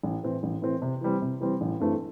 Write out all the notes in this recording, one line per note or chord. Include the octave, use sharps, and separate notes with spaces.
A1
A2 E3 C4
A1
A2 E3 C4
C3
E3 G3 C4
C3
E3 G3 C4
A1
G2 E3 A3 C4